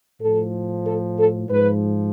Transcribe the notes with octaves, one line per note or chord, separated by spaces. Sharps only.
A2 F3 A4
A4
A4
G#2 F3 B4